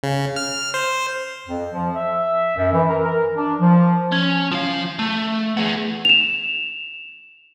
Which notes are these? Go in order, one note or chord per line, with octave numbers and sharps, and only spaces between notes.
C#3
F6
C5
F2
F3
E5
F#2
E3
A#4
A#4
D4
F3
C#4
F3 F5
A3
B3 G#4
E7 F7